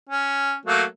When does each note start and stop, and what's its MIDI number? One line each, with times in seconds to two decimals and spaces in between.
0.09 0.54 61
0.66 0.83 54
0.66 0.83 57
0.66 0.83 58